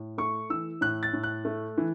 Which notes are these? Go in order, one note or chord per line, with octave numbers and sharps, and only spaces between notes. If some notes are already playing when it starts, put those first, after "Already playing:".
Already playing: A2
A3 C#6
E3 E6
A2 F#6
A6
A2
F#6
A3
E3